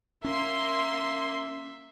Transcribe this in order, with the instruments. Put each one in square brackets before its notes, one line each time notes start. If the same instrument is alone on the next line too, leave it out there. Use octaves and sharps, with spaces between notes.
[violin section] A#3 C6 [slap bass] C#4 [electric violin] E5